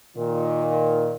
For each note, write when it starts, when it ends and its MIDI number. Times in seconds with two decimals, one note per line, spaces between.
0.17 1.15 46
0.17 1.15 51